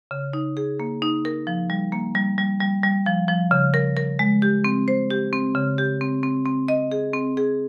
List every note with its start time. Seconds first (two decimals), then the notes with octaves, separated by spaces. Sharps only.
0.11 C#3
0.33 D#4
0.57 G#4
0.80 A#3
1.02 D#4
1.25 A#4
1.47 F3
1.70 G3
1.92 A#3
2.15 G3
2.38 G3
2.60 G3
2.84 G3
3.06 F3
3.28 F3
3.51 C#3
3.74 A#4
3.97 A#4
4.19 G#3
4.42 G4
4.64 C4
4.88 C5
5.10 G4
5.33 C4
5.55 C#3
5.78 G4
6.01 C4
6.23 C4
6.45 C4
6.68 D#5
6.92 G#4
7.13 C4
7.37 G#4